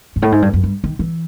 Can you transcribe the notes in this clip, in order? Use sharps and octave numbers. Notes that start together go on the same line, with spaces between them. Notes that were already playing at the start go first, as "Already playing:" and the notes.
G#2
A2
G#2
G2
F#2
G2
D#3
E3